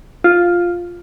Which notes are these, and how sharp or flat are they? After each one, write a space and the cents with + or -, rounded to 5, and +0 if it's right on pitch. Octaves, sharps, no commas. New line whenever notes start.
F4 +5